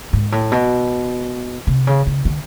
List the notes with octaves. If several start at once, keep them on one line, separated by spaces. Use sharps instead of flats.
G#2
A2
B2
C3
C#3
C#3
D3